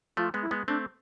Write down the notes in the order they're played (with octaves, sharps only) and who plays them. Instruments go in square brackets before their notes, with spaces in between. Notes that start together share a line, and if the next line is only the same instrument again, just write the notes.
[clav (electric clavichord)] F3 A3 [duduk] F4
[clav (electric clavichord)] G#3 B3
[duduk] E4
[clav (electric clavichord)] G#3 B3
[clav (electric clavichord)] A3 C4 [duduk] D4